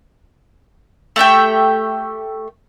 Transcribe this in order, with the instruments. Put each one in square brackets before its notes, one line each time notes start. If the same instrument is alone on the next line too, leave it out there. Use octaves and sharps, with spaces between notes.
[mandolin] A3 G4 E5 G5